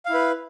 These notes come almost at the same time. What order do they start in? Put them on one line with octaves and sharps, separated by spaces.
F5 E4 B4